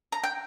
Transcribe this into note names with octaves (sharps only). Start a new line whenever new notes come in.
A#5
G5